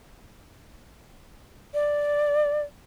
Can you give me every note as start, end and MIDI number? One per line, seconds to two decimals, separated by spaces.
1.74 2.63 74